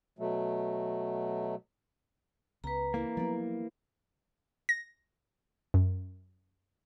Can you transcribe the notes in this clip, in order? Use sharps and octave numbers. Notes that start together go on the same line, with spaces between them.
B2 F#3 A3
C#2 B3 B4 A#5
E3 A#3 C4 E4
F3 F#3 B3 G4 D5
A#6
F#2